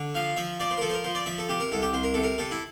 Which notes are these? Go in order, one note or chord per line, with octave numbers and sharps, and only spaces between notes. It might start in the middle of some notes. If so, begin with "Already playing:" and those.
Already playing: D3
F3 F5
F3 E5
F3 D5
C5
A#4
F3 A4
C5
A#4
F3 C5
D5
F3 E5
A4
C3 G4
A#4
C2 A4
G4
C2 C5
A#4
C3 A4
A#4
C3 A4
E4